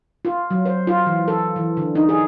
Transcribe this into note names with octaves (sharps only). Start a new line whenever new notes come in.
F4
F#3
C5
F4
E3
A4
E3
D3
D#4
G#4